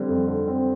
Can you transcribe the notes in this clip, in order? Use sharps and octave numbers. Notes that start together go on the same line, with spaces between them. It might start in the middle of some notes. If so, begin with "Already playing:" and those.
Already playing: D3 G3 C4
F2
D3
C4